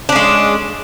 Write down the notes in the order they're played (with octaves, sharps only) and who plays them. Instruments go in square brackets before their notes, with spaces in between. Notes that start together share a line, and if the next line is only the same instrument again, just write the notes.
[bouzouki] D4
C#4
G#3